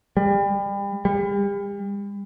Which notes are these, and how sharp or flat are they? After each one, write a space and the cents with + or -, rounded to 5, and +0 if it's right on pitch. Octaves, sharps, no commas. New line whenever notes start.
G3 +35
G3 +40